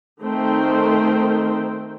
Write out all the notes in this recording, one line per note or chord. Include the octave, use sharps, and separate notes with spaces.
D#3 A3 C4 C5 G5